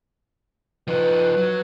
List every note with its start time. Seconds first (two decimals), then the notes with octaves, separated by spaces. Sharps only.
0.88 F3 D#4 B4
1.37 F#3